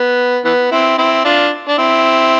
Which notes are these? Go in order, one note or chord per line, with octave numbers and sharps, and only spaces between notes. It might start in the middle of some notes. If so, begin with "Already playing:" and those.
Already playing: B3
E3 B3
C4 E4
C4 E4
D4 F4
D4
C4 E4